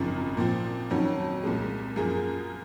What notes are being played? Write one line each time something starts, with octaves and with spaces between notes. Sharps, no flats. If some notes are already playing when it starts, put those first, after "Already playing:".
Already playing: G#1 F#2 C#3 F3
A#2 F3 C4
F2 D#3 F#3 C#4
C2 A#2 F3 G#3
F#2 F3 A#3 F4 G#4